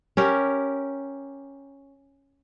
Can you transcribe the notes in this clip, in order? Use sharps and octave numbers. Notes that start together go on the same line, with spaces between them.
C#4 G4 A#4